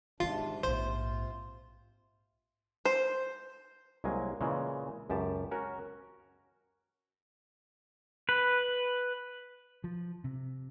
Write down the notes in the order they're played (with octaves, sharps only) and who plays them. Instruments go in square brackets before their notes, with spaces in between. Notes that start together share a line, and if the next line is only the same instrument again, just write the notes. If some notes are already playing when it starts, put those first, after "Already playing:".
[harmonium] G#2 C3 D4 [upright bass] D#3 B3 [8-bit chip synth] F4
[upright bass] A#1 G#2 [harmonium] C3 F4 [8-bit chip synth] C5
[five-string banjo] C5
[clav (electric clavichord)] C2 F#3 G#3 A#3 G#5
A#2 C#3 E3 G#3
C#2 F#2 G4 A5
C#4 F#4 A#4
[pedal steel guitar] B4
[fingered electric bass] F3
C3